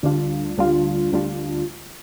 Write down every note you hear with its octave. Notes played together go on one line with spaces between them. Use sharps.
D2 D3 G3 D4 F4
D2 D3 G3 D4 F4
D2 D3 G3 D4 F4